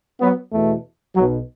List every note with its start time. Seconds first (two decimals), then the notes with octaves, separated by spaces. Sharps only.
0.21 F#3 B3
0.53 E2 B2 A3
1.15 B1 F#3
1.21 B2